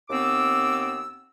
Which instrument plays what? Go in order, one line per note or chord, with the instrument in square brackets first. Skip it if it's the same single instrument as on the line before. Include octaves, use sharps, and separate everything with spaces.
[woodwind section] D#2 B3 C4 D6 E6